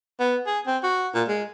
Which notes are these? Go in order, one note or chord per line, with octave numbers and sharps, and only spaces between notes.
B3
G#4
C4
F#4
A#2
G#3